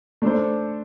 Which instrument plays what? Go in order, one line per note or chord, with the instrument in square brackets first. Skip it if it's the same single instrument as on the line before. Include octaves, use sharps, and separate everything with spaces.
[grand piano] A3 D4 A4 C5